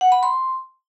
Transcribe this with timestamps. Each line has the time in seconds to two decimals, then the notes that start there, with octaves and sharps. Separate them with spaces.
0.01 F#5
0.12 B5
0.23 C6